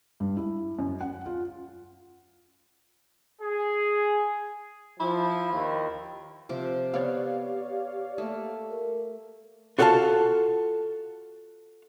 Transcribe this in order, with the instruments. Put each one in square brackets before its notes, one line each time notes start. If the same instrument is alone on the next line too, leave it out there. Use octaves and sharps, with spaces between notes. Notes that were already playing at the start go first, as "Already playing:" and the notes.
[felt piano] G2
E4
F#2
F#5
F4
[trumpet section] G#4
[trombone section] F3 [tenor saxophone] E4
[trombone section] D#2
[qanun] C3 F3 D6
[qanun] B3 [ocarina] G4 [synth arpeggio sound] C#5 D5 F5
[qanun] A3 A#3
[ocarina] A#4
[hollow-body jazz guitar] F4 F#4 A4 C#5 F5 A5